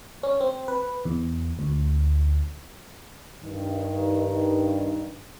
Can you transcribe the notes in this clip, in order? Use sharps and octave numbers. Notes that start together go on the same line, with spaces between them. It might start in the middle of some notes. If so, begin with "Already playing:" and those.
C#4
C4
B4
E2
D2
G2 D#3